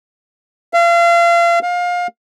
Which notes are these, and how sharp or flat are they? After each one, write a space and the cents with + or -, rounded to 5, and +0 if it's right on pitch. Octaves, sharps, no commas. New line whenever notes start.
F5 -35
F5 +25